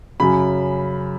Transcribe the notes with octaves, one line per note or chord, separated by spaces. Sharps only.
F#2 C#3 B5